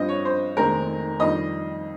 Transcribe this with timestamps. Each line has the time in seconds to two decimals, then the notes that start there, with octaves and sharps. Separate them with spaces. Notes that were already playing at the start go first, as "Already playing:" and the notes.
Already playing: G2 F3 C4 D#5
0.09 C#5
0.25 C5
0.57 F1 D#2 D#3 G#3 C4 A#4
1.20 F2 D#3 G3 D#5